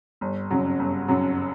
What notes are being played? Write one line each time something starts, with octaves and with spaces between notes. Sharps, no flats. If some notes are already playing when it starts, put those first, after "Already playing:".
G1
F#2 C#3 F#3
G1
F#2 C#3 F#3